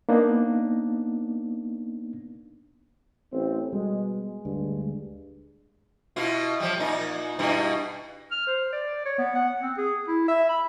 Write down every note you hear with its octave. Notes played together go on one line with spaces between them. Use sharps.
A#3 B3 D4 D#4
A1 C4
B2 G3 G#3
D2 G2
B2 E4 F4
F3 G3
A#2 D#4
G2 B2 E4
F6
C5
D5
C#5
B3
F#5
C4
G#4
E4
E5
B5